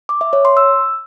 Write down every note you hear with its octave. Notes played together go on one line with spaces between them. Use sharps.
D6
E5
C#5
C6
E6